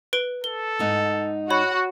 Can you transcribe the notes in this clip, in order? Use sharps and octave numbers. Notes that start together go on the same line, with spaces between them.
B4 D7 G7
A4 G7
G#2 D#4 F#5
F#4 C#5 B5 F#6